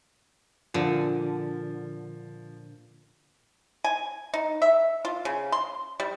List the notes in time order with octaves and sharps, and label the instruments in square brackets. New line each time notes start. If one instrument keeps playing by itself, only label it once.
[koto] A#2 D3 [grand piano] F3
[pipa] G#5
D#4
E5
F4
C#3
C6
G3